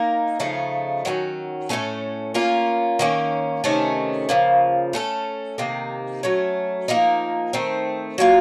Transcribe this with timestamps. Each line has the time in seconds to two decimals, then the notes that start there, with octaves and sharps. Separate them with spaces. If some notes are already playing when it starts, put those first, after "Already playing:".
Already playing: A#3 D#4 A#4
0.40 C#3 F3 A3 D#4
1.05 D#3 F#3 A3 C#4
1.69 A2 A3 C#4 A4
2.34 A#3 C#4 F4 A#4
2.99 D#3 A#3 C#4
3.64 C3 D#3 A3 C#4
4.29 C#3 F3 A#3
4.93 A3 C#4 A4
5.58 C3 D#3 A#3
6.23 F#3 A3 C#4
6.88 F3 A#3 D#4 A#4
7.53 D#3 A3 C4
8.18 F#3 A#3 F4